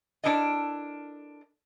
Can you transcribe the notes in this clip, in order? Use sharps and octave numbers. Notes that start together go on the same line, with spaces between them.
D4 E4 A4 A#4 D#5